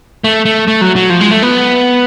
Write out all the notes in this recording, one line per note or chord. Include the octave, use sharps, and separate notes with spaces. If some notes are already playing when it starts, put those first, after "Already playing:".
A3
A3
A3
F#3
F#3
F3
G#3
A3
B3